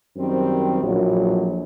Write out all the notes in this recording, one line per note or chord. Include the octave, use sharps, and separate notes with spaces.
F#2 D#3 G3 C4
A#1 A2 F#3